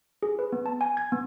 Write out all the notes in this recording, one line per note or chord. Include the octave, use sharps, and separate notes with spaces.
G#4
B4
B3
A5
G#5
G#6
B3